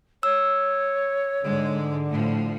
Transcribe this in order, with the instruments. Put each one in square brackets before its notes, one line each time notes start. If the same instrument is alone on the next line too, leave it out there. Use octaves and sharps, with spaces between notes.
[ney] C#5 [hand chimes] E6
[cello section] G#2 G#3 [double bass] D3
[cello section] A2 F3